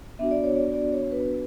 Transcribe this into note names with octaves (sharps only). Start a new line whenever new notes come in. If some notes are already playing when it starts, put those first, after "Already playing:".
B3 D4 F#4 E5
D5
C#5
D5
D5
C#5
B4